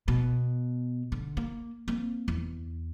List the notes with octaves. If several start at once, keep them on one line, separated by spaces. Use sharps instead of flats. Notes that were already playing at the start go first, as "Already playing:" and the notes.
B2
D3
A#3
A#3 C4
E2